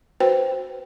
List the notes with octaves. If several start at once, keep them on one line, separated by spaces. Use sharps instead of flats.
F#4 B4 C5 G5